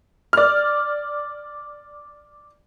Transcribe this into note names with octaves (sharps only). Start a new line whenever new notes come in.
D5 F6